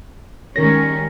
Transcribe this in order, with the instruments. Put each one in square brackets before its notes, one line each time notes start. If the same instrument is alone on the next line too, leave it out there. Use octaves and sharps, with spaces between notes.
[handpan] D#3 A#4 C#5 [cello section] G3 G#3 C#4 [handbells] A#6